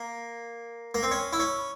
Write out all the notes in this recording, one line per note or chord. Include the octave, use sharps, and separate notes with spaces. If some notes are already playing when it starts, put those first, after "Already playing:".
Already playing: A#3
A#3
C4
C#4
E4
C#4